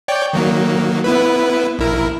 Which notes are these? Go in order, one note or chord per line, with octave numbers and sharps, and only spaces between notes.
C#5 D5 G5
D#3 F#3 A#3
B3 E4 B4
A#1 E4 A#4